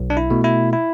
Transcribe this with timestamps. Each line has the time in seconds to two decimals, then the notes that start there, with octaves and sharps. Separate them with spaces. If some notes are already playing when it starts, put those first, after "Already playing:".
Already playing: B1
0.10 D4
0.17 E4
0.30 B2 A3
0.44 E4
0.73 E4